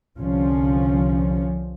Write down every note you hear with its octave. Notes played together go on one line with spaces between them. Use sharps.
C2 D3 F3 C#4